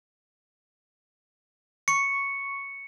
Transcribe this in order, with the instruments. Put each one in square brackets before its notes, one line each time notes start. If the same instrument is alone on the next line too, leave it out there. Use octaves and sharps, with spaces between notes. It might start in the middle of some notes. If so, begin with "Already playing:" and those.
[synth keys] C#6 [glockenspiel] C#7